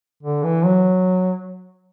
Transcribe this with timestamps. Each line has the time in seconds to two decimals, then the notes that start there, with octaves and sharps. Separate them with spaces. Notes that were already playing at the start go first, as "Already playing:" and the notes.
0.23 D3
0.43 E3
0.65 F#3